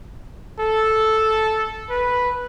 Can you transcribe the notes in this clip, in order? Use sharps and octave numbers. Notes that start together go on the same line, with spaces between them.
A4
B4